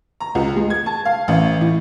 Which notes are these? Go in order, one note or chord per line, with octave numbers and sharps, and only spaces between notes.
A#5
C#2
G#3
G#6
A5
F5
A1
A2